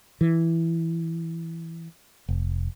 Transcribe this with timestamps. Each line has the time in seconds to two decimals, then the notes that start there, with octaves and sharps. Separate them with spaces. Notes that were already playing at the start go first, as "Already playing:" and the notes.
0.21 E3
2.29 F1